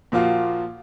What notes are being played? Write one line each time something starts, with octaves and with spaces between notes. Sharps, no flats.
A#2 F3 A#3 F4 F#4